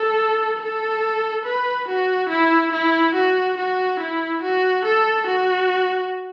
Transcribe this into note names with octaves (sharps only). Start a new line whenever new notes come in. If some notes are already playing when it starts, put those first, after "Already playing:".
Already playing: A4
A4
B4
F#4
E4
E4
F#4
F#4
E4
F#4
A4
F#4